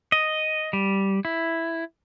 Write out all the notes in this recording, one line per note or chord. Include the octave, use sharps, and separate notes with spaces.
D#5
G3
E4